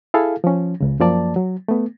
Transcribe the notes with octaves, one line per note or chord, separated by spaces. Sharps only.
E4 G#4 A4 F5
F3 C#4
C#2 C#3
F#2 F3 A#3 D5 A5
F#3
A3 B3